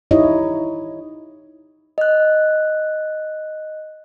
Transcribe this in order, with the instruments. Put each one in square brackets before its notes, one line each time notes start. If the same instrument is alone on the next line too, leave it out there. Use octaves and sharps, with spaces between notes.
[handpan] D#4 E4 G4 C#5 D#5
[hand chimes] D#5 F#6